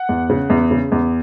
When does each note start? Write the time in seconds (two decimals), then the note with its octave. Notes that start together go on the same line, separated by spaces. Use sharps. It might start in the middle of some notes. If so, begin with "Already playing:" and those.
Already playing: F#5
0.09 E2
0.30 C#3
0.50 E2
0.71 C#3
0.92 E2